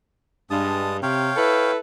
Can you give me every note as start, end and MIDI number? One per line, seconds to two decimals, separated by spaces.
0.50 0.98 43
0.50 0.97 56
0.50 0.97 81
0.50 0.97 87
1.03 1.30 48
1.03 1.72 73
1.03 1.72 77
1.03 1.72 79
1.36 1.77 64
1.36 1.77 69
1.36 1.77 71